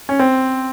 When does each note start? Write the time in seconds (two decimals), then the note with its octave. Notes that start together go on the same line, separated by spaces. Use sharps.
0.09 C#4
0.19 C4